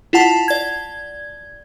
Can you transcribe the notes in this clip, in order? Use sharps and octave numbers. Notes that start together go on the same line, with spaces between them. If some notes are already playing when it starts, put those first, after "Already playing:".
E4 F4 F#5 A5
D5 G#6